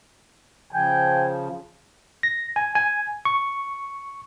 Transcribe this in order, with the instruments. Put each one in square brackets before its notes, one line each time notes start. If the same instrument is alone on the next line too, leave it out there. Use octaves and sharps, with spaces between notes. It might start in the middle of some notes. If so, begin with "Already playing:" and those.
[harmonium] C#3 F3 [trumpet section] G5 G#5
[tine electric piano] A#6
G#5
G#5
C#6